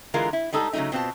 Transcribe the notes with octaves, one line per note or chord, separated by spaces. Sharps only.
D3 E3 G#3 F4 A#4
E4
G3 G#3 D#4 A4
C#3 F#3 G#3 A3 D#4
B2 C4 F4 A5